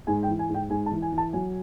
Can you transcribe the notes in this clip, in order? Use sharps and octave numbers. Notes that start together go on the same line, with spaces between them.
G#2 G#5
G5
E3
G#5
G#2
G5
G#2 G#5
A5
E3
G#5
E3
A5
F#3 G#5